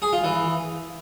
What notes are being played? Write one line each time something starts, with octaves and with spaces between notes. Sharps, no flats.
G#4
F4
E3